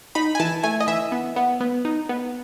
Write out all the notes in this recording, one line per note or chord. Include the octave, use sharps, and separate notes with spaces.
D#4 B5
G#5
E3 A5
A3 G#5
D#5
E3 E5
B3
B3
B3
D#4
B3